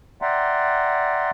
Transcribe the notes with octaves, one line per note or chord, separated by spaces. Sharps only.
D5 E5 F#5 G5 A#5 C6